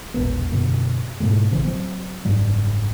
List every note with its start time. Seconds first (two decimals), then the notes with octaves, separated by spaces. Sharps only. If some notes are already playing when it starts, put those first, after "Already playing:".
0.14 E1 A#1 A#3 B3
0.52 F#2 B2 D3 A#3
1.20 G#2 B2 G3 A3
1.51 A1 C#3 E3 C4
1.65 F#3 C4
2.25 F#1 G#2 F#3 G3